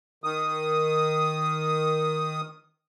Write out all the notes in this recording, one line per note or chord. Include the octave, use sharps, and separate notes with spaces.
D#3 D#6